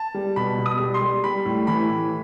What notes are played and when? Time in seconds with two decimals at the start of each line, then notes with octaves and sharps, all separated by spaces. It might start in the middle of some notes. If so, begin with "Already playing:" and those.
Already playing: A5
0.14 G3
0.36 B2 B5
0.58 B2
0.66 D#6
0.79 G3
0.94 C6
1.02 G3
1.24 G3 B5
1.46 A2
1.67 E3 B5
1.89 A2